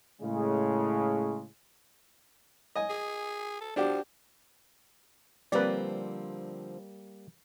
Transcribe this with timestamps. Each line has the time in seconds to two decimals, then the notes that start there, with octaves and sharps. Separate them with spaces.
0.21 A2 C#3 G#3
2.75 D#5 G#5
2.90 G#4
3.61 A4
3.76 F3 D4 F#4 G4
5.52 D3 F3 G3 A#3 C4 B4 D5